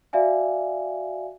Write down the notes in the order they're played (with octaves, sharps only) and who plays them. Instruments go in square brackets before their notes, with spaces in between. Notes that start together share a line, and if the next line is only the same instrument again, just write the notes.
[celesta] F#4 D5 E5 F5 G#5